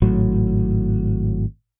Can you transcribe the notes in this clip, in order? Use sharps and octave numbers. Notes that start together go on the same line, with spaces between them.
G#1 A2 F#3